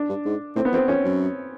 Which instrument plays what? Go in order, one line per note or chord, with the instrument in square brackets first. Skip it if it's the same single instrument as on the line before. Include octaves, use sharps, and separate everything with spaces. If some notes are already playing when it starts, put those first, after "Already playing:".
Already playing: [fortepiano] D4
[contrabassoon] G2
G#2
[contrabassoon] A2 [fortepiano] C4
[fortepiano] B3
[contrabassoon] F2 [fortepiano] C4
[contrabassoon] F2 [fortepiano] C#4
[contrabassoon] F#2